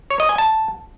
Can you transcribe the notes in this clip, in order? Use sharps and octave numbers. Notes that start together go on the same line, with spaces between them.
C#5
D#5
G#5
A5